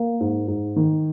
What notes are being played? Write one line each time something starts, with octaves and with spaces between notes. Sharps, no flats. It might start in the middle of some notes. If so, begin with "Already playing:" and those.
Already playing: A#3
G#2
G#2
D#3